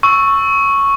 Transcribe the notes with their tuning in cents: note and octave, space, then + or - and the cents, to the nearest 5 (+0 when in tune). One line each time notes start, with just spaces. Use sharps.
C#6 +0 E6 +0